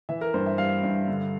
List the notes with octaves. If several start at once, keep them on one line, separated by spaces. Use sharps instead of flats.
E3 E5
A#4
G2 C5
E5
G3 F5
G2
D3